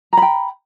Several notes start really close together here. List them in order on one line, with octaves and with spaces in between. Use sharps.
A#5 B5 G5